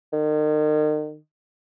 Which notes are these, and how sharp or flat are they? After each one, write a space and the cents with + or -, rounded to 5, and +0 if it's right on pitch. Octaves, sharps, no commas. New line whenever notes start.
D#3 -40